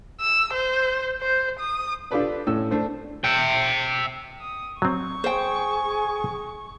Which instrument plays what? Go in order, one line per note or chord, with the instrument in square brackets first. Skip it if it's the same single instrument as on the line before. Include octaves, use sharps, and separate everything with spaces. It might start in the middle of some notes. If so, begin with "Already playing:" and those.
[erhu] E6
C5
C5
D#6
[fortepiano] D4 F4 G4 A4 B4 D5
A2 C#4 A4 E6
A3 D4 C5
[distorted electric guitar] E5 G5
[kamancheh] D#6
[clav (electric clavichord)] F#3 C4 [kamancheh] C#6
[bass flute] G#4 [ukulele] C5 G5